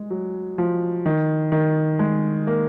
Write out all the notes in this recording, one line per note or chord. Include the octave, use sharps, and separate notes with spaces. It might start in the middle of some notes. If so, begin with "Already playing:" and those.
Already playing: G#3
F#3
F3
D#3
D#3
G#3
A#3